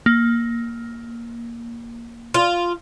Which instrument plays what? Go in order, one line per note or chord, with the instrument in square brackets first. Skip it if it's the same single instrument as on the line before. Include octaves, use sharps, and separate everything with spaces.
[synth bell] A#3
[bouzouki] F4